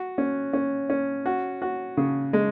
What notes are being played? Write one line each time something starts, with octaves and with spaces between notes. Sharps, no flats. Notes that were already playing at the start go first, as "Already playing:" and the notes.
Already playing: F#4
C#4
C#4
C#4
F#4
F#4
C#3
G#3